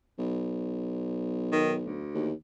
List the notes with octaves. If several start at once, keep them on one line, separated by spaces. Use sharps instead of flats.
B1
D#3
D2
D#2